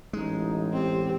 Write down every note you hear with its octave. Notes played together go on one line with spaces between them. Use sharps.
A1 G#3 D#4
C4 G4